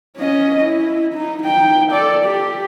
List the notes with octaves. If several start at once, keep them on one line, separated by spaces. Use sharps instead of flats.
C#4 D#5
E4
D#4
D#4 G5
A4 D5
G4